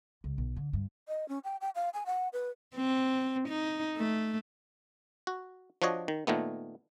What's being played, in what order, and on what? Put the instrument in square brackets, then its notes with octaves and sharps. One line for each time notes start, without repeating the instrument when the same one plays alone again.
[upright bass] C#2
B1
D3
G2
[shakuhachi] D#5
C#4
G5
G5
F5
G#5
F#5
B4
[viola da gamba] C4
D#4
A3
[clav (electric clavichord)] F#4
F3 D4 F#4 C#5 D#5
D#3
A#2 D#3 A3 B3